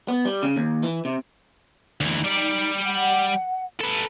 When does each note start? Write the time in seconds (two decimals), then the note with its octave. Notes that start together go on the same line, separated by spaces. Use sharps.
0.08 B3
0.25 G3
0.43 C#3
0.56 D#2
0.83 E3
1.05 C3
2.01 D2 E3 D#4
2.24 G3 D5
2.85 F#5
3.80 A4 B4